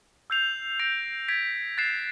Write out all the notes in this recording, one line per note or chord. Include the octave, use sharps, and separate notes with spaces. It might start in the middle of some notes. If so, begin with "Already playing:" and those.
E6 G6 C7 F7
G6 A#6 D7
G#6 B6 D7
F#6 A6 C7 E7